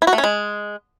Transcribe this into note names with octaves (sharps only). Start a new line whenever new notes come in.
E4
F#4
A3
C#4
G#3